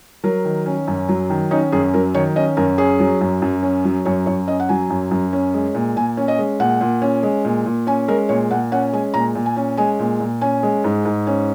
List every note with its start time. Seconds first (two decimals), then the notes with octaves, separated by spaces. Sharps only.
0.24 F#3 A#4
0.45 D#3
0.66 C#4
0.88 F#2
1.09 F#3
1.30 D#3
1.51 C#4 D#4
1.72 F#2 G#4
1.94 F#3 A#4
2.15 D#3 C#5
2.36 C#4 D#5
2.57 F#2 A#4
2.78 C#4 G#4
3.00 F#3
3.21 F#2
3.42 F#2
3.63 C#4
3.85 F#3
4.05 F#2 C#5
4.26 F#2 C#5
4.48 C#4 D#5
4.60 F#5
4.69 F#3 G#5
4.90 F#2
5.11 F#2
5.33 C#4
5.54 G#3
5.74 A#2
5.96 A#2 G#5
6.17 C#4
6.28 D#5
6.39 G#3
6.60 A#2 F#5
6.81 A#2
7.02 C#4
7.23 G#3
7.45 A#2
7.66 A#2
7.87 C#4 G#5
8.08 G#3 A#4
8.29 A#2 C#5
8.51 A#2 F#5
8.72 C#4 F#5
8.93 G#3 G#5
9.14 A#2 A#5
9.35 A#2
9.46 G#5
9.57 C#4
9.78 G#3 G#5
9.99 A#2
10.20 A#2
10.41 C#4 G#5
10.63 G#3
10.84 G#2
11.05 G#2
11.27 C#4